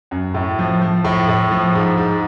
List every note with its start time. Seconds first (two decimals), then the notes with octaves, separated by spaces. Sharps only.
0.11 F#2
0.34 A2
0.59 F3
0.82 F3
1.04 A2
1.28 A2
1.51 F3
1.75 G#2
1.97 G#2